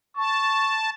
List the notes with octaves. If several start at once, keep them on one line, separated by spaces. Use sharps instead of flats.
A5 C#6